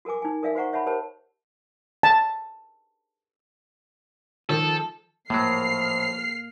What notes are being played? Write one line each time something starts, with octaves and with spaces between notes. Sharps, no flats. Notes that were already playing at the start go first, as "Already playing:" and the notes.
F#4 A4 A#4 G#5 D6
D#4 G#5
A4 A#4 D5 E5 F5 G#5
F#4 C5 F5 F#5 A#5 C#6
C#5 E5 F#5 A5 B5
G4 A#4 C5 C#5 A5
A5
D#3 F3 A4
A2 F3 F#3 A#3 F6 C7